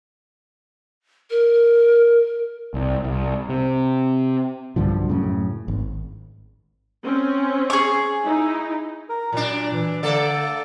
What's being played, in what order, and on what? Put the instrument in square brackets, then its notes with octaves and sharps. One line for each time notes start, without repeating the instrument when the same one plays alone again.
[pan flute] A#4
[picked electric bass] C2
C2
C3
[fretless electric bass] B1 G2 D3 F3
F#2 A2 C#3
G#1
[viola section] C4 C#4
[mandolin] G#4 C#6
[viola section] D#4 E4
[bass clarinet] A#4
[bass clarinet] A#2 [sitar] F#3 D4
[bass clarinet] E3
[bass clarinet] D3 [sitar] A3 A4 D5